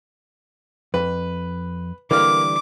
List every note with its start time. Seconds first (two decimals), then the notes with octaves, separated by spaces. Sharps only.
0.94 F2 B4
2.11 D3 E3 G3 A#3 D6 F6